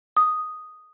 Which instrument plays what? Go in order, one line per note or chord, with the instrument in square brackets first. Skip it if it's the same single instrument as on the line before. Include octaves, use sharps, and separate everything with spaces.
[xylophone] D#6